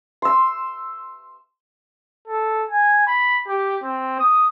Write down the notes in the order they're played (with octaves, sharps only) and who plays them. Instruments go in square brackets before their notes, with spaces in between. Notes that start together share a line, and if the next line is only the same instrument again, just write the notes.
[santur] C6 E6
[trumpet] A4
G#5
B5
G4
C4
D#6